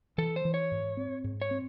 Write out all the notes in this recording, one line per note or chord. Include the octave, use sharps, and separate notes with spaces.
E3 A4
C5
E3
C#5
G#2
C4
G#2
C#5
C4